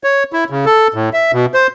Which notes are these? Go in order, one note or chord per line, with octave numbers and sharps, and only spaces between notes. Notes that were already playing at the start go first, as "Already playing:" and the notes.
C#5
E4
C#3
A4
A2
E5
B2
C5